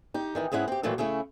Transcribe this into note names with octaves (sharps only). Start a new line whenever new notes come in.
D#4 G4
D#3 E3 D#4
G#2 G#3 C#4 E4 F#5
C4 G4
A#2 D#3 E3 F#3 A3 A#3
C#3 A3 C#4 E4